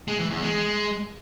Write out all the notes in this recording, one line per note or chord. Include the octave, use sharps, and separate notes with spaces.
G#3
E3
E2
G#3